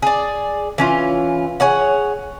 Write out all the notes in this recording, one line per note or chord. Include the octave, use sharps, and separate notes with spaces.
G#4 D5
E3 C#4 F4
G#4 C#5 F#5